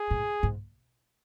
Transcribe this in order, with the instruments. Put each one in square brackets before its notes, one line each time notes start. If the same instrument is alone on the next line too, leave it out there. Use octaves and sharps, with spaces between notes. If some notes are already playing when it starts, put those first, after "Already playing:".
Already playing: [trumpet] G#4
[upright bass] A2
G#2